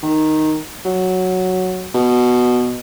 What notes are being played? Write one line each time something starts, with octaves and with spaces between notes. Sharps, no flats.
D#3
F#3
B2